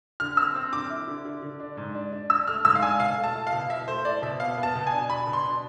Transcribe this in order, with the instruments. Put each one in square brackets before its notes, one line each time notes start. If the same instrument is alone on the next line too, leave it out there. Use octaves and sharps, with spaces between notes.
[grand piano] D3 F6
C4 E6
C4
D3 D6
E4
D3
D3
D3
D4
G#2
D4
D4
D4 E6
A3 F6
G#2 E6
F5
D4 G#5
B2 F5
A3
A5
E4
F5
B2
E4 E5
A3 C5
E4 D5
B2 E5
B3 F5
B3
A5
B2
G#5
D4
D4 B5
B2
C6
D4